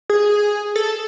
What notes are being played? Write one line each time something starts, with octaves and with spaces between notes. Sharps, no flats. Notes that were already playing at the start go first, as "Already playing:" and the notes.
G#4
A4